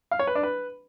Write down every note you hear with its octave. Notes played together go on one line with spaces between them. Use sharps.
F5
C#5
B4
D4
B4